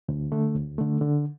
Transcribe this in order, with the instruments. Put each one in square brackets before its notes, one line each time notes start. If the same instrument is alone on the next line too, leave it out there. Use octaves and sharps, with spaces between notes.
[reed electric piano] D2
D3 A3
D2
D3 A3
D3